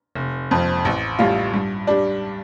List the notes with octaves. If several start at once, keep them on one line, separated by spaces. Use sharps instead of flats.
F1
F2 F3
A1
A2 G3 F4
G2
G3 D4